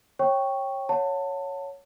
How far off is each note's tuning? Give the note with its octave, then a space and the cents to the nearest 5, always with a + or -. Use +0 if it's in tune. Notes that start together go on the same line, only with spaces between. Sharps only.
C#5 -25 G5 +0 C#6 +0
C#5 +0 F#5 -35 A5 +25